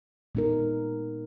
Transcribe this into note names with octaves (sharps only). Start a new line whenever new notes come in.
A#2 G#3 B3 D#4 A#4